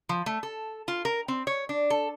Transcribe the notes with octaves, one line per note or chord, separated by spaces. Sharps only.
F3
A3
A4
F4
A#4
C4
C#5
D4
A4